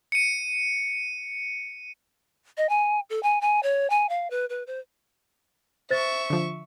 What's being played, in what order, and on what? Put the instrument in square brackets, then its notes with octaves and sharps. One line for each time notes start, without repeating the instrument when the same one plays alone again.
[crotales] C#7 D#7
[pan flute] D#5
G#5
A4
G#5
G#5
C#5
G#5
F5
B4
B4
C5
[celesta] C5 A6 [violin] E5 C#6
[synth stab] D3 F3